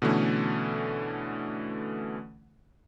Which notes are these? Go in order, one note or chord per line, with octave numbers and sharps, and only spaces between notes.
B2 D3 E3 A3 C#4